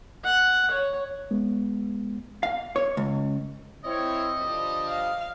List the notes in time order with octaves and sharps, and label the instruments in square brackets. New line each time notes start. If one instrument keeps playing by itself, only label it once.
[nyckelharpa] F#5
C#5
[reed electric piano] G#3 B3
[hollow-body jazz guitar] F5
C#5
C#2
[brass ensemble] C4 E4 C#5 [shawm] D#5
[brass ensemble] D3 F3 G3
[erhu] F5